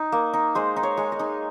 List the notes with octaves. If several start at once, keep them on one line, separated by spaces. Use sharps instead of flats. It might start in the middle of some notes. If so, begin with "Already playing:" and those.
Already playing: D#4
A#3
D#4
G#3 C5
D#4
C#5
G#3
D#5
D#4